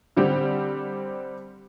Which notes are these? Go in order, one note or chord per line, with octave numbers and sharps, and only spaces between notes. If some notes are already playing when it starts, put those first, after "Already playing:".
D3 G3 C4 G4